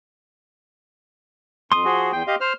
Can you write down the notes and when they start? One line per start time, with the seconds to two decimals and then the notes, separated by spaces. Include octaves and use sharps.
1.72 F2 C6 D#6
1.85 F3 F#4 G#4
2.13 E2 G5
2.27 G4 D#5 F5
2.41 C5 F6